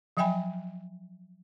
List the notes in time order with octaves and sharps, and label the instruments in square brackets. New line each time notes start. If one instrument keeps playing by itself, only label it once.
[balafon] F3 F#3 E5 G5 G#5 B5